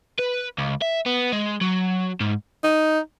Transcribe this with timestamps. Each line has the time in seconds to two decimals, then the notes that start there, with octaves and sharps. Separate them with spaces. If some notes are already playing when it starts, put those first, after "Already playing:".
0.19 B4
0.58 C#2
0.82 E5
1.06 B3
1.32 G#3
1.61 F#3
2.20 G#2
2.64 D#4